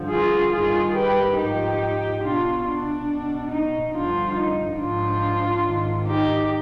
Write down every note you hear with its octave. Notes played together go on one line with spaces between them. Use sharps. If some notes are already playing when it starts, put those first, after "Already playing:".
Already playing: G2 D3 F3
F4 G#4
G2 D#3 F4 G#4
G4 B4
G#2 F3 D#4 G4
B2 D4 F4
D4
B2
D#4
G2 D3 F3 D4 F4
D#4
G#2 F3 D4 F4
G#2 D#3
D#4 G4